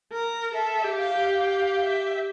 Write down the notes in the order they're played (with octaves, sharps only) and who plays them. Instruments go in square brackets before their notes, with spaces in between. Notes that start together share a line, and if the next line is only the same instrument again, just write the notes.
[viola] A#4
[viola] A4 [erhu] E5
[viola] G4
[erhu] F5
[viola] G4
[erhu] F5
E5